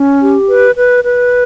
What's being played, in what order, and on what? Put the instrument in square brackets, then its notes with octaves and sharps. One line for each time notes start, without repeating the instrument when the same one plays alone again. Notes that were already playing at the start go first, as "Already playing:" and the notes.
Already playing: [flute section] C#4
G4
B4
B4
B4